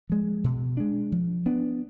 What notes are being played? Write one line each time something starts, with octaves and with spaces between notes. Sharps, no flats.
F3 G#3
B2
G#3 D4
F3
B3 D4